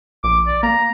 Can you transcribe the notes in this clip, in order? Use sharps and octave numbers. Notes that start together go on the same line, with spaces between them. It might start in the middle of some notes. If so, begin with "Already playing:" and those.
A#1 D6
D5
A#3 A#5